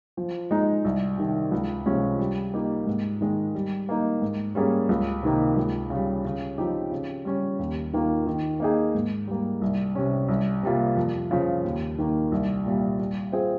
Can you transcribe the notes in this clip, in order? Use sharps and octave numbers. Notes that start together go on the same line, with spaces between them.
F3
G#3 D#4
C2
C3 D#3
C#2
C3 F3 G#3 C#4
G3
A#3 D#4 G4
G#2
D#3 G#3
G3
A#3 D#4
G#2
G3 A#3 C#4 G#4
C#2
C3 D#3 A#3 D#4
C#2
C#3 G3
C#3
F3 C4 D#4 G4
C#3
G3 C#4
D#2
D#3 A#3 F4
D#3
A#3 D#4 G#4
G#2
G3 A#3
C2
C3 G3 C#4
C2
C3 G3 A#3 F4
F2
C#3 F3
D#2
D#3 A#3
C2
A#2 G3
G3
C4 F4 G#4 C5